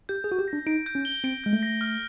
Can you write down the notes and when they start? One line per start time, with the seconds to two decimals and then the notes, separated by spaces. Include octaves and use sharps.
0.09 G4 G6
0.24 G#4
0.29 F#4 G6
0.39 G4
0.48 A#6
0.53 D4
0.67 D#4 D7
0.86 G6
0.95 C#4
1.05 G7
1.24 C4 D7
1.44 G#3 G6
1.53 A3
1.63 A#6
1.81 F6